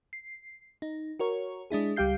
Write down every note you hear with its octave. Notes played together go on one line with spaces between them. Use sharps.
C7
D#4
F#4 A#4 C#5
G#3 D4 E4 G#4
C#2 G3 G4 F5 G6 C7